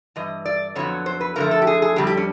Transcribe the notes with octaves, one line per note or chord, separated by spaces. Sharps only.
G2 E3 D#5
D5
F2 D3 F#3 B3 C#5
C5
B4
F#2 D3 F3 A3 A#4
A4
G4
G#4
G#4
F2 D3 G3 C4 G4
G4
C#4